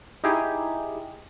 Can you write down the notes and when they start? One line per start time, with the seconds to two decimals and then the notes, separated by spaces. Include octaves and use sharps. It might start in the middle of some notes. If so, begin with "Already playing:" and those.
0.24 D#4 E4 G4 G#4